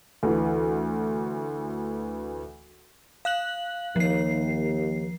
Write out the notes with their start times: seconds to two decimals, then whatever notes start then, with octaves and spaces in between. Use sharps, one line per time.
0.23 D2 E3
3.25 F5 F#6 F#7
3.96 D#2 F3 C7